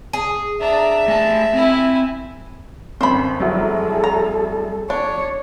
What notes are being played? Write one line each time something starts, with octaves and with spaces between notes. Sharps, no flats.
G#4
D4 E5 A#5
A3 G#5 A5
C4 E4 G#5
G1 F#2 C4 C5 B5
F1 F#3 G3 E4 G#4 A4
A#5
D4 C#5